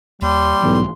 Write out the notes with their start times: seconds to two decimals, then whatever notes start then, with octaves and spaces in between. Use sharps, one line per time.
0.22 D#2 G3 C6
0.63 B1 G#2 B2 E3